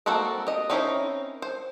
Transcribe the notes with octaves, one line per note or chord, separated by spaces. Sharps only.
A#3 C4 F#4 A4 A#4
G4 D#5
C4 C#4 D#4 E4 A#4
C5